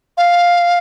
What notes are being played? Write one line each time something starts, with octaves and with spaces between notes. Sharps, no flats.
F5